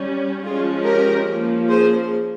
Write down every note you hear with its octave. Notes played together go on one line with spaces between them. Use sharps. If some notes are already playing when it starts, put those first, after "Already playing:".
Already playing: G3 C#4
F3 G#3 C#4 F4 G#4
G4 A#4
F3 A#3 C#4
G#4 C5